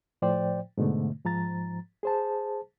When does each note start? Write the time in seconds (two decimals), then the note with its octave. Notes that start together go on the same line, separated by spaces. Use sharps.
0.22 A2 F3 C5 D5 G5
0.78 G#2 B2 D3 A3
1.25 G#2 F3 A#5 A6
2.03 G#4 C5 A5